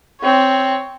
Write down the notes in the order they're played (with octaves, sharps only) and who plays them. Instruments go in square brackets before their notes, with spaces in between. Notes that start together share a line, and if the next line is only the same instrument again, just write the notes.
[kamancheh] C4 C#5